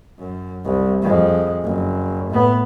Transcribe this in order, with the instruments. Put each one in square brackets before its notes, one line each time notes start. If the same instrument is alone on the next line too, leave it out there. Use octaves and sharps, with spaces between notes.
[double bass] F#2
C2
F2 G#3
F#1
A2 B3